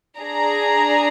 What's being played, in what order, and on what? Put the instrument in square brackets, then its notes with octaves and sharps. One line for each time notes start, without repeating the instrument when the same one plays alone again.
[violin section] D4 G#4 A#5